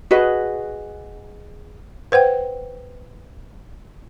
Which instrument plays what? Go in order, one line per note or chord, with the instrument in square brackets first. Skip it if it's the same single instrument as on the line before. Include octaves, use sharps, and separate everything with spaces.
[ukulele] F#4 G#4 B4 D#5
[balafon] B4 C5 F#5 G5